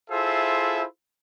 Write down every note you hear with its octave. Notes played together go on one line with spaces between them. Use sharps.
E4 F4 G#4 A4 C5 E5